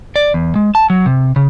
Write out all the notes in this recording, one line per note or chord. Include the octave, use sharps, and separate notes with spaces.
D5
E2
G#3
A5
F#3
C3
C#3